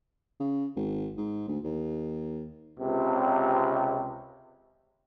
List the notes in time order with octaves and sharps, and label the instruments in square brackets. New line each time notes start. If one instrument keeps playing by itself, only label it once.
[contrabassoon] C#3
G#1
G#2
D2
D#2
[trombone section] C#2 C3